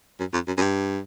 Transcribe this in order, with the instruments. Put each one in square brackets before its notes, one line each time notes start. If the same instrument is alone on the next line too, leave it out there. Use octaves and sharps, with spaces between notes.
[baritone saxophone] F#2
F2
F#2
F#2
G2